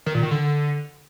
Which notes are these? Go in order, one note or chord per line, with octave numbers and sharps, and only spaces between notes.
D#3
A#2
D#3
D3